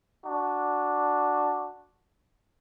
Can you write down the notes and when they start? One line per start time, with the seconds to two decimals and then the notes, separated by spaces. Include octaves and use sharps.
0.24 D4 F#4